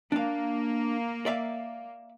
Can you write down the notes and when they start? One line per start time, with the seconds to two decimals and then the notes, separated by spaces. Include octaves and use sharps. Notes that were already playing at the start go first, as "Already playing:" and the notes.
0.12 A#3 D4 F5
1.26 D5 E5 F5